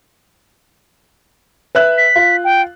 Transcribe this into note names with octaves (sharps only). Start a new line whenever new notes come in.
B4 E5 F#6
B6
F4
G5